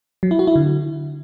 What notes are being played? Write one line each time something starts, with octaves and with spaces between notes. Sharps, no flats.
F#3
E4
F#4
E4
D3